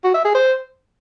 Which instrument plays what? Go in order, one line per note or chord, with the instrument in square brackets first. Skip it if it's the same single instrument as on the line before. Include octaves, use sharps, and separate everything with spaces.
[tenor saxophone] F#4
E5
G#4
C5